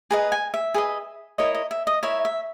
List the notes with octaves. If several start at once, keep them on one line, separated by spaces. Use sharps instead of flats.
G#4 B4 D#5 A#5
G#5
E5
G#4 B4 D#5
E4 A#4 C#5 D#5
D#5
E5
D#5
E4 A#4 C#5 E5
E5